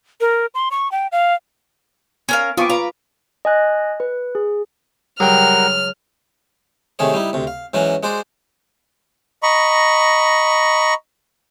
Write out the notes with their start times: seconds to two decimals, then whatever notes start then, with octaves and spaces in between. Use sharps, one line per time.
0.21 A#4
0.55 C6
0.71 C#6
0.92 G5
1.12 F5
2.29 C#4 A#4 F5
2.57 B3 C4 F4 C#6 D6
2.70 F4 B4 A#5
3.45 D#5 G#5 F#6
4.00 B4
4.35 G#4
5.20 C#2 F#3 G3 A#4 F#5 G5 F6
6.99 C3 D#3 A3 G#4 C#5
7.14 G3 D#4 E4
7.33 D2 C3
7.47 F5
7.74 G#2 E3 F#3 C#4 F#4
8.03 G#3 F#4 C5 D5
9.43 D#5 A#5 B5 C#6